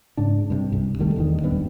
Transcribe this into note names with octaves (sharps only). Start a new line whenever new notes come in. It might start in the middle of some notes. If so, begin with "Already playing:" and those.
G#2 C#3 D4
G2 C3
C2
D#1 D#3 G3 A3
E2 G2 D#3
D#1 B1 G2 B3